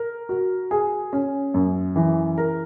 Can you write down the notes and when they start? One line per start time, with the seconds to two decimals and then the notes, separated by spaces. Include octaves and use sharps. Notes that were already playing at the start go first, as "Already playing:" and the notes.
Already playing: A#4
0.29 F#4
0.71 G#4
1.13 C#4
1.54 F#2
1.96 E3
2.38 A#4